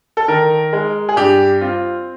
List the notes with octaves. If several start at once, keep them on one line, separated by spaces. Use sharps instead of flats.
A4
D#3 A#4
G#3
G#4
G2 G4
C4 F4